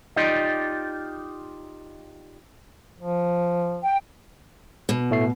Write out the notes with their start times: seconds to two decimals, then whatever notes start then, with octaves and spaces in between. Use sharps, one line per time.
0.16 D#4 F4 G4 D5 D#5
3.00 F3
3.82 G5
4.89 B2
5.11 A2 A3 C7